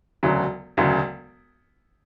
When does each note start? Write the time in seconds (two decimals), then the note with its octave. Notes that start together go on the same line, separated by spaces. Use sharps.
0.23 E1 D2 C#3 F#3
0.77 E1 D2 C#3 F#3